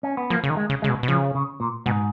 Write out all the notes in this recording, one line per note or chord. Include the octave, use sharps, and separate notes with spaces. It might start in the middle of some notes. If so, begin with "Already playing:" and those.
C#4
B3
F3 A#3
C#3
D#3
G#3
C#3
C#3 G#3
B2
B2
C#3 F3
C#3
A#2
G#2 B2